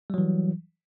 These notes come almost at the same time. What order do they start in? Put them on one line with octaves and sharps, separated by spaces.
G3 F#3 E3